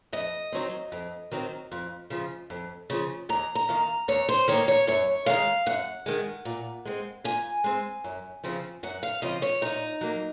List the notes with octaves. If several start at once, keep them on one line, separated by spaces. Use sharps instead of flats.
F2 D#5
D#3 F#3 C4
F2
D#3 F#3 C4
F2
C#3 F3
F2
C#3 F3
D#2 A#5
A#5
D#3 A#3
D#2 C#5
C5
D#3 A#3 C#5
C#5
F#2 C#5
D#3 G#3 F5
F#2 F#5
D#3 G#3
A#2
G#3 C4
A#2 G#5
G#3 C4
F#2
C#3 F3 C4
F#2 F#5
F5
C#3 F3 C4 D#5
C#5
A#2 D#4
F#3 A#3